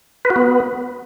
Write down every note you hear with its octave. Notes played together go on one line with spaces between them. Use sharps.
B4
F#4
B3